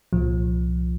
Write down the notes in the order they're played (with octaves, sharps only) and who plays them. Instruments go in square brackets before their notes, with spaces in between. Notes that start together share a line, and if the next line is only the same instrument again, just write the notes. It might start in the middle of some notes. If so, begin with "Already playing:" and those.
[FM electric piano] C2 A#2 F3